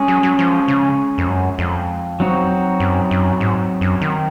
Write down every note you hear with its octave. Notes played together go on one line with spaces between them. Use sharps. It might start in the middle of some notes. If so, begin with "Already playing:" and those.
Already playing: G#3 C#4 G#4
F#3
F#3
F3
C#3
F2
F#2
F2
F#3 C4 D#4 F#4
F#2
F#2
G#2
F#2
D#3